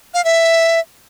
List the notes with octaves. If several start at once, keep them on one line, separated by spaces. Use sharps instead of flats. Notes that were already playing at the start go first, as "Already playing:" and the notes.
F5
E5